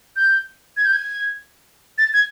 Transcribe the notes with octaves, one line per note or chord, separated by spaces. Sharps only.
G6
G#6
G6
G#6
A6
G#6